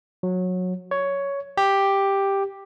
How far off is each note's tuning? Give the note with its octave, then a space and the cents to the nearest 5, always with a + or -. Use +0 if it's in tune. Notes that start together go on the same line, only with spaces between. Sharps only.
F#3 -20
C#5 +10
G4 +5